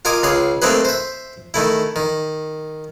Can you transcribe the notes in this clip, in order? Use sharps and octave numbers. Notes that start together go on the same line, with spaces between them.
F4 A#4 D#5 G#5 D6
C#2 G#4 F5
A3 A#3 C4 D#4 G#4 B4
C5 E5
D#3 A3 E4
D#3